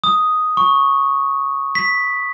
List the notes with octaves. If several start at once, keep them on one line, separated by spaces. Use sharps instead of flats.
D#6
C#6
B6